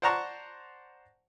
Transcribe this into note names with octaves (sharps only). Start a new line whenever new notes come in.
C5 D5 F#5 A5 A#5 C#6